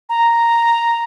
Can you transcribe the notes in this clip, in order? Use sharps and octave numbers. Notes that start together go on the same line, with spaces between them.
A#5